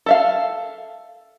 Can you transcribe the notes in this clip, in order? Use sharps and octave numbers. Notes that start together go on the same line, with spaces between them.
A4 E5 F5